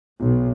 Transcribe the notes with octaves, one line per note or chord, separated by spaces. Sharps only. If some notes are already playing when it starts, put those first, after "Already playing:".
B1